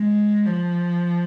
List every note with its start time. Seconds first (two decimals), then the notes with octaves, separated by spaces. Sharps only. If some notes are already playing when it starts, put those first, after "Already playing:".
Already playing: G#3
0.46 F3